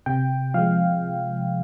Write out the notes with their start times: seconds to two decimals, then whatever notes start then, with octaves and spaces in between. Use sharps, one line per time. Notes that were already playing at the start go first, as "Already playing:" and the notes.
0.06 C3 G5
0.54 F3 G#3 F5